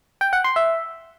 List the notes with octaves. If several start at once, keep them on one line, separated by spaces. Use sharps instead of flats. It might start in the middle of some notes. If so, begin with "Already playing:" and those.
G5
F#5
C6
E5